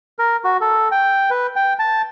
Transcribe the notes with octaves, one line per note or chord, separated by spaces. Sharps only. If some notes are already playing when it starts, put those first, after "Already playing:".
A#4
F#4
A4
G5
B4
G5
A5